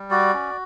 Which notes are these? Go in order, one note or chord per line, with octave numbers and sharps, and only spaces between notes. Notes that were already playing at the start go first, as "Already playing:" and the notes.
Already playing: G3
F#4 D5
C#4